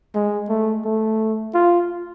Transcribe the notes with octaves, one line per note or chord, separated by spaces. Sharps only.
G#3
A3
A3
F4